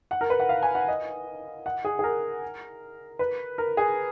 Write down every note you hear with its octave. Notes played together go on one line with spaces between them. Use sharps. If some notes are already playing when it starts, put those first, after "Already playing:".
F#5
A#4
B4
F#5
F5
G#5
F#5
D#5
F#5
G#4
G#4
A#4
B4
A#4
G#4